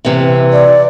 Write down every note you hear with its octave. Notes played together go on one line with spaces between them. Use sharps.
C3 E3
D5